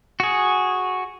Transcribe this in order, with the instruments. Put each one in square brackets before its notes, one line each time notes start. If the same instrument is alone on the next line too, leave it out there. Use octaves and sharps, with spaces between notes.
[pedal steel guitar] F#4 G#4